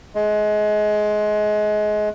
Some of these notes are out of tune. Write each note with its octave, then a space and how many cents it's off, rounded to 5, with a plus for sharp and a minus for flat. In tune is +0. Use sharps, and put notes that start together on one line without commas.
G#3 +25